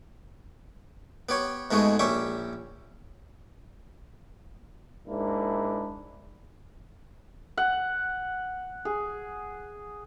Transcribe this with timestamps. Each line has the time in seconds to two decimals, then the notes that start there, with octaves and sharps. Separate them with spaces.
1.29 B3 G4 C#5
1.71 G#2 B2 G#3 A3 F#4
1.99 A#1 C#4 G4 E5 C#6
5.07 G#2 A#3 D4 E4
7.57 F#5
8.85 G#4